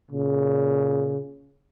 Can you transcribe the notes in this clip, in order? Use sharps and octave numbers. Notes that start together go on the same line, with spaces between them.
A#2 C#3